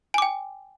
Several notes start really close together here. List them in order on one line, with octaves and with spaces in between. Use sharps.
G#5 D6 G5